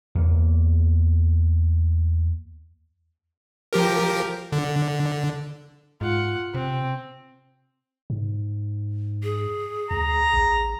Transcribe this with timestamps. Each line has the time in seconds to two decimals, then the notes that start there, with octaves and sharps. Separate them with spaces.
0.15 E2 A#3
3.73 F3 G4 A#4
4.52 D3
6.01 G#2 F4 F#5
6.55 C3 C4
8.10 G#2
9.23 G#4
9.91 D2 A#5
10.34 A1